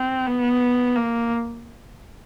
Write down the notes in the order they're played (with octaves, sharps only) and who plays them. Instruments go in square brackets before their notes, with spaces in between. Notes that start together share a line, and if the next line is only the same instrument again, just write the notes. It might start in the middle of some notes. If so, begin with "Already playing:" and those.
Already playing: [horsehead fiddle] C4
B3
A#3